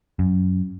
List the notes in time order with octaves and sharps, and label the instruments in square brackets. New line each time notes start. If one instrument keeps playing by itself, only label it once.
[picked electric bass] F#2